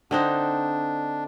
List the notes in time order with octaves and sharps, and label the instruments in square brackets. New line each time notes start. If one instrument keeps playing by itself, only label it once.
[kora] D3 C4 D#4 [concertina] D4